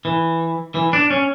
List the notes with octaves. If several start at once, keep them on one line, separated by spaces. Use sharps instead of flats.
E3
E3
D4
C#4